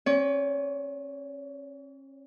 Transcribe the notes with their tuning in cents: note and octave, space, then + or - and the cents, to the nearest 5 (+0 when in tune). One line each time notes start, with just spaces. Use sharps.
C#4 -35 C#5 +40